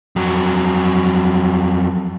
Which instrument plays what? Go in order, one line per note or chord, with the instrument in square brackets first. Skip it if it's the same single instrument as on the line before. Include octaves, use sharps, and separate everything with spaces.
[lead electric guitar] F2 F#3